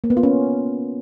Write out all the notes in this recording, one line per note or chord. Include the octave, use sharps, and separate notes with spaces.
A#3
B3
F4
C#4